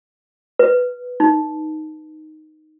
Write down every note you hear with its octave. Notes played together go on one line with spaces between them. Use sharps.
B4
D#4